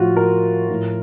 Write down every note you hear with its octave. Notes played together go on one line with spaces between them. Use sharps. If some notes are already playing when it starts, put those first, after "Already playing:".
Already playing: A2 F3 F4 F#4
A#4
A2 F3